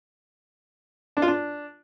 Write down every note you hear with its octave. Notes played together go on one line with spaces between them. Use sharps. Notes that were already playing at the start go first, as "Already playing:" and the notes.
D4
F4
D4